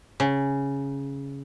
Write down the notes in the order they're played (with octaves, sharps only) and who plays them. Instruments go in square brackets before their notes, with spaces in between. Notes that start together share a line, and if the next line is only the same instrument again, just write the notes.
[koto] C#3